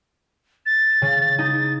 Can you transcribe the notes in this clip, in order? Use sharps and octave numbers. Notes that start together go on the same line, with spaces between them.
A6
C#3
D#4